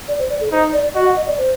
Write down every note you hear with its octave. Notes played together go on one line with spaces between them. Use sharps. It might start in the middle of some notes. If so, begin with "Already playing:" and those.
D5
C5
D5
A4
D#4 C5
D5
F#4 D#5
F#5
D#5
D5
C5